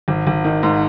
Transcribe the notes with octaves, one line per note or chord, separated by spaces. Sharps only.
G#1
G#1
D#3
G#2